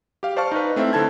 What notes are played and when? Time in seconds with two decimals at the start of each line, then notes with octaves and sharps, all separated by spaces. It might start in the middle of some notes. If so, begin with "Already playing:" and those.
0.23 G4 F5
0.36 C5 D5 F5 A5 C#6 F6
0.52 D#4 B4
0.76 A3 C4 E4 E5
0.93 D3 A4 A5 G#6